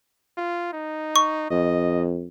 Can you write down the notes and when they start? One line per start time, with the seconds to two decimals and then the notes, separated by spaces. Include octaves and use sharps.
0.37 F4
0.73 D#4
1.16 C#6
1.51 F2 D#5